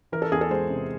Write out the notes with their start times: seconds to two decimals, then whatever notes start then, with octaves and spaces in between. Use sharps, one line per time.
0.12 E3 A#4
0.22 A4
0.32 E2 G#4
0.41 A4
0.51 G#3 C5
0.70 C3